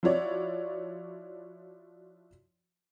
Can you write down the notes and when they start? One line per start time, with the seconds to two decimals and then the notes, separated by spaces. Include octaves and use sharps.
0.03 F3 E4 F#4 C#5 D5